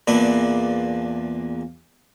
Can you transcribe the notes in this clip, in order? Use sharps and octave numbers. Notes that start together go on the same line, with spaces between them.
E2 A#2 A#3 D4 B4 D5